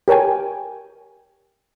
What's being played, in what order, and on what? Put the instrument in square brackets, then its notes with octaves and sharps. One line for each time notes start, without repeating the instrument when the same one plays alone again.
[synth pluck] G4 A#4 C#5 G5 G#5